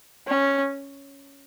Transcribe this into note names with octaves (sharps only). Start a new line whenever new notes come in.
C#4